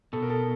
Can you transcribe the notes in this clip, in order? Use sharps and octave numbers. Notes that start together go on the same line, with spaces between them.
B2 A4
A#4
A4